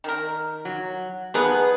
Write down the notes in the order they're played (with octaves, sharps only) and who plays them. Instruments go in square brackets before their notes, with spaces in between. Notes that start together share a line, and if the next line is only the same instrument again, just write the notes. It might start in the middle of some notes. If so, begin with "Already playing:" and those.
[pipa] D#3 A#4
[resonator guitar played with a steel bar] F#3
[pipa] F3 D#4 [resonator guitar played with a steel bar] B3 G#4 B4